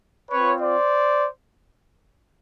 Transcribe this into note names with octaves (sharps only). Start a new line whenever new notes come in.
C4 F4 B4 C#5
C5 D5